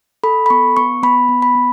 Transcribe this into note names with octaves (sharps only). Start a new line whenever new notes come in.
A4 B5
B5
B3 C#6
B3 C#6
B3 B5
B3
B5
B3